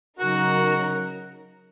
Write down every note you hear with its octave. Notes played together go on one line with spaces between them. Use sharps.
C#3 F#3 D#4 F#4 A#4